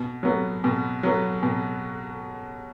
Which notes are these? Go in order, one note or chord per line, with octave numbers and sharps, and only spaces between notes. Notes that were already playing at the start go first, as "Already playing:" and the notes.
Already playing: B2
F#3 B3
B2
F#3 B3
B2